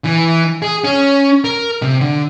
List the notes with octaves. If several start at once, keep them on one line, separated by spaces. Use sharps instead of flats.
E3
G#4
C#4
A#4
C3
D3